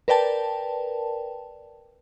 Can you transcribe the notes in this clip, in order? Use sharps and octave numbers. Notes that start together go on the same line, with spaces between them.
A#4 B4 D5 G5 A5